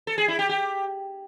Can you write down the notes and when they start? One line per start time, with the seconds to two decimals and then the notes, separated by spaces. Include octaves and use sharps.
0.07 A4
0.18 G#4
0.28 E4
0.39 G4
0.49 G4